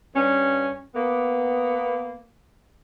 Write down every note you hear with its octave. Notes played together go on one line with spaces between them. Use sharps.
G2 C#4
A#3 B3